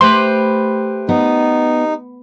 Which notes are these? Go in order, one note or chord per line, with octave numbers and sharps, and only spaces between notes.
A3 G4 B4 C5 C6
B3 D#4